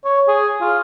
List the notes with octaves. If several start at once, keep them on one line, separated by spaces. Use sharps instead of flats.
C#5
G#4
F4